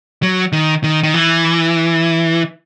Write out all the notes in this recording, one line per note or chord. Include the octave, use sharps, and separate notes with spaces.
F#3
D#3
D#3
D#3
E3